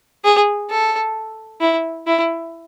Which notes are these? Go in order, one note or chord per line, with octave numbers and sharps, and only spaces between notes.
G#4
A4
E4
E4